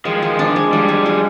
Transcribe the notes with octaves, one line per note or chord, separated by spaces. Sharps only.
D#3 F3 G#3
G#3
D4
G#3
F3 G3 G#3
G#3
G#3